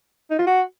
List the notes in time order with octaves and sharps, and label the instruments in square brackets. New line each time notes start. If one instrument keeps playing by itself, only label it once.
[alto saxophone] D#4
F4
F#4